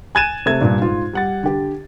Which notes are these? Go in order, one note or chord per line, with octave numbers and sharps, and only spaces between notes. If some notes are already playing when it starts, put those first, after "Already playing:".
G#5 F#6 G#6 A6 D#7 E7
C3 A3 G#6
G2 A#2 D4
G#2 F4
G3 F#5 A6
D3 G4